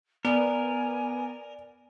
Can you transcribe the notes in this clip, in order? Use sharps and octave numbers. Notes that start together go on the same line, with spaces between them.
B3 A#4 D5 G#5